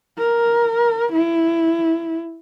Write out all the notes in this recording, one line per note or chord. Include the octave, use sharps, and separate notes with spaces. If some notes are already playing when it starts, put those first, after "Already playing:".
A#4
E4